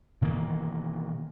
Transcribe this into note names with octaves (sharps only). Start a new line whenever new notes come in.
B2 D#3 E3 A#3